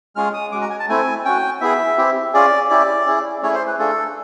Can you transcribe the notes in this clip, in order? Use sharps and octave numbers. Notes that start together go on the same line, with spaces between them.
G#3 C#4 F4 G#4 F6
D#6
G#3 C#4 F#4 D6
A#5
G#5
A5
A3 C4 E4 G#5
C#4 F#4 G5
B3 E4 G#4 E5
C4 E4 G4
C#4 F4 G#4 D5
C#4 E4 G4 D5
C#4 E4 G#4
A3 C#4 E4 G#4 C#5
C5
B4
A3 D4 F4 G#4 A4